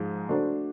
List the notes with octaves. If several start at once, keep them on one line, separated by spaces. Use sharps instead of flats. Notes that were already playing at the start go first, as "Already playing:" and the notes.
Already playing: G#2 F3 G#3
A3 D4 F#4 A4 C5